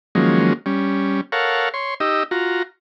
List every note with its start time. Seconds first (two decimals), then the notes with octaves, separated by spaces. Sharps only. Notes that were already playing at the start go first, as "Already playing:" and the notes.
0.15 D#3 F3 F#3 G#3 A#3 C#4
0.66 G3 C#4
1.32 A4 A#4 C#5 F5 F#5
1.74 C#5 C6
2.00 D#4 G4 D#5 E6
2.31 F4 F#4 A#5